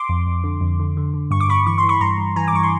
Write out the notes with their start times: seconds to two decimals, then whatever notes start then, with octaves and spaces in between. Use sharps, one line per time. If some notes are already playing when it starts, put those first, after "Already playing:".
Already playing: C6 D6
0.09 F2
0.27 F2
0.44 D3
0.61 F2
0.80 D3
0.97 D3
1.14 D3
1.31 G2 C#6
1.40 D6
1.48 G2 B5 C#6
1.67 E3 C#6
1.78 C6
1.83 E3
1.89 B5 C#6
2.01 G2 A#5 C6
2.18 G2
2.36 E3 G#5 A#5
2.48 D6
2.53 G2 C#6
2.63 C6